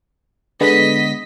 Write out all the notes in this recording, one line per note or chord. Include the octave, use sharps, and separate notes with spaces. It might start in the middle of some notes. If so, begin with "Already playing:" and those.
D3 G#3 B3 D#5 B6